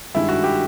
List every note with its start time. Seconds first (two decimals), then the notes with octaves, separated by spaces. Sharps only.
0.15 G2 D#3 G#3 E4
0.28 F#4
0.44 G4